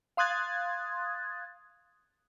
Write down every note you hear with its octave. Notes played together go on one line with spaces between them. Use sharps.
F5 C6 D#6 F#6 G#6 A6